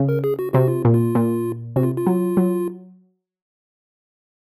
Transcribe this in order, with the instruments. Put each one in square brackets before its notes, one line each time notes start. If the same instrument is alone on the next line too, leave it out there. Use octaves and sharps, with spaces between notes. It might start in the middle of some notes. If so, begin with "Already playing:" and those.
Already playing: [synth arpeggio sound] C#3
[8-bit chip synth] A#4
G#4
F#4
[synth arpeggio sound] C3 [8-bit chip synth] F#4
[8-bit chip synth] F4
[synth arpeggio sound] A#2
[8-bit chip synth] F4
[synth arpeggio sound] A#2
[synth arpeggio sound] C3 [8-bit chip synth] F#4
[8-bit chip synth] F4
F4
[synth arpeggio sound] F#3
F#3